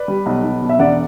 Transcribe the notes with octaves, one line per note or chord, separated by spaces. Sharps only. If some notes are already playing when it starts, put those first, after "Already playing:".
Already playing: B4 D5
G3
B1
B1
B2
E5
E1 D5 F#5